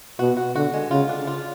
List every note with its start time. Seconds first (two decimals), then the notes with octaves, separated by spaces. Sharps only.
0.19 B2 F#4
0.37 F#4
0.55 D3 F#4
0.74 G#3
0.91 C#3 F4
1.09 D4
1.27 F4